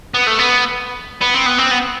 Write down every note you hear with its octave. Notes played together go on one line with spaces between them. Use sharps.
B3
A3
B3
B3
C4
B3
C4
B3